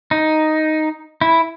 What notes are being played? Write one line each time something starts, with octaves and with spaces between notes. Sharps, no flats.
D#4
E4